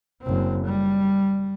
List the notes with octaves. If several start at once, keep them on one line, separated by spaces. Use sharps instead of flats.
F#1 C4
G3